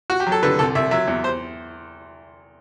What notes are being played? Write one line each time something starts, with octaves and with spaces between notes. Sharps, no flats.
F#4
G4
F#3
A4
D3 B4
C2 A4
C2 E5
F#3 E5
E2
C5